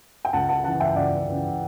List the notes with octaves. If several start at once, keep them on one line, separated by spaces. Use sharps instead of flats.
G5
C#2 F#5 A5
F#5 A5
C#3 E3 F#5 A5
E5 G5
C#2 D5 F#5
C#3 E3